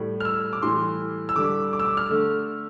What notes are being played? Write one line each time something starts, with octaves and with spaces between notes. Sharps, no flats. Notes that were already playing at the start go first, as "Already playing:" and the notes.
Already playing: A2 G3
F6
E6
D6
A2 E3 G3 C6
E6
D3 G3 D6
D6
E6
D6
F6
D3 A3